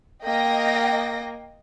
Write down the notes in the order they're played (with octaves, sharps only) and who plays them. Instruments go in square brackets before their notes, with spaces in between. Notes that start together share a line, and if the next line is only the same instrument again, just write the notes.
[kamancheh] A#3 [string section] D#5 G5 A#6